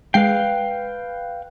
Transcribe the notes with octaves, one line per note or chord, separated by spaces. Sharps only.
G#3 B4 F5 G5 C7